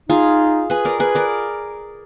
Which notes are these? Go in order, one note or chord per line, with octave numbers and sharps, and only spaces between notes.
D#4 F4 G#4
G#4 B4
A#4 D5
G#4 B4
A#4 D5